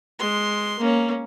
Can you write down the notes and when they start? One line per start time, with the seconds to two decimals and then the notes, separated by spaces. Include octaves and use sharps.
0.19 G#3 C6
0.79 A#3 C#4